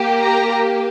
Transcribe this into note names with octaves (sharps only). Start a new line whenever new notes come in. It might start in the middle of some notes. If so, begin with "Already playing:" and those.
Already playing: A#3 G4
A#5